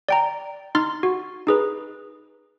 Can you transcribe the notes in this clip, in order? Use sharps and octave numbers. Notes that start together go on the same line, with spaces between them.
D5 G5 A#5
D#4 C6 F6 A6
F#4
D#4 G#4 B4